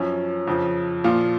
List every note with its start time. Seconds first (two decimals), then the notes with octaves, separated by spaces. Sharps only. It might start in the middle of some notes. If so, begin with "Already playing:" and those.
Already playing: F#2 F3 C#4
0.47 F2 C#3 F3
1.04 A#2 F3 F4